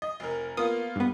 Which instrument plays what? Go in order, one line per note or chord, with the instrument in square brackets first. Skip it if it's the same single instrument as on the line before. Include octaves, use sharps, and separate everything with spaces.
[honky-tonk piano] D#5
F1 A#4
[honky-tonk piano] A#3 B3 F4 [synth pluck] D#6
[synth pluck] G2 B3